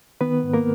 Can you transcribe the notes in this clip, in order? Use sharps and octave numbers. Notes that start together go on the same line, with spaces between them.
D#3 B3 B4
G#2
A#3 A#4